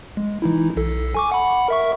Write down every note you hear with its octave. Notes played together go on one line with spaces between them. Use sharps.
G#3
E3 D#4 E4
B1 A4
G#5 C#6 D6
F#5 B5
A#4 E5 C#6